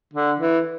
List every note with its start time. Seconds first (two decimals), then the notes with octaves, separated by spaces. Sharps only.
0.14 D3
0.40 E3